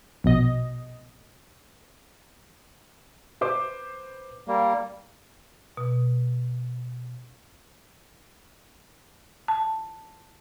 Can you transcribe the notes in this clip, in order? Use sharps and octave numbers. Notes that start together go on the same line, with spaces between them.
A#1 B2 D#5
B4 C5 D6
G3 A#3
B2
A5